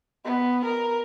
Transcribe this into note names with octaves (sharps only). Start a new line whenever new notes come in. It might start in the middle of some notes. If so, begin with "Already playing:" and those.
B3
A#4